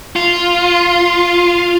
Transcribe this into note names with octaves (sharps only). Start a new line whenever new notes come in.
F4